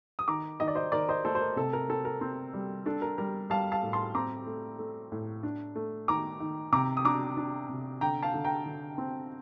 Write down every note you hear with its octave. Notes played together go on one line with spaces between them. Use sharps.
D#6
D#3 A#5 D6
D#3 D#5
D5
C5 D#5
D#3 A#4 D5
C5 D#5
A3 A4 C5
C5
A#4
C3 A4
A#4
C4 A4
A#4
C4
G3
D4 A4
A#4
G3 A#4
G3 F5 A5
F5 A5
A2
A5 C6
C4 A#5 D6
A3
A3
A2
D4
A3
D#3 A#5 D6
D#3
C3 A#5 D6
D#6
D4 A#5 D6
D4
C3
D3 G5 A#5
F5 A5
D3
G5 A#5
D3
C4